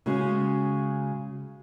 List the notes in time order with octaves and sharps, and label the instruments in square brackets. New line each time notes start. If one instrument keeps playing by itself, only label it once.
[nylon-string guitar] C#3 G#3 F#4